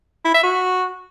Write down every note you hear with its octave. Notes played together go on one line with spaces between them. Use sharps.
E4
E5
F#4